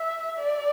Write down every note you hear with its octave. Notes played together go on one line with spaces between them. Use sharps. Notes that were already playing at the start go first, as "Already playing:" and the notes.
Already playing: E5
D5